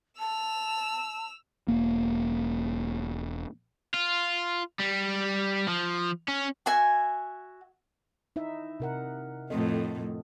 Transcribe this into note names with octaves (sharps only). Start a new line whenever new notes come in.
A5 E6 F7
E1 A#3
F4
G3
F3
C#4
F#4 E5 G#5
D#4 E4 E5
C3 A#4 F#5
F2 A2 C4 A4 D#5